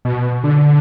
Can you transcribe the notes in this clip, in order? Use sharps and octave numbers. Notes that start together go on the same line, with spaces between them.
B2
D3